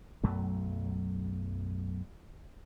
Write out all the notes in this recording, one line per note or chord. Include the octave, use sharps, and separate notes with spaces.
B1 F#2 F#3 A3